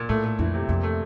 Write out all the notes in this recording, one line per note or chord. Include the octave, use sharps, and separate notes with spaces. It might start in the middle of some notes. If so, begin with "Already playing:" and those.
Already playing: A#2
A2 A3
A3
F2 E3
C3
F2 A#2
A3